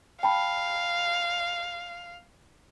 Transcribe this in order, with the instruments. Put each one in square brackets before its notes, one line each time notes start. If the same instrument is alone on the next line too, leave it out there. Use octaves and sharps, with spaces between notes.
[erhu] F5 [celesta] G5 A5 B5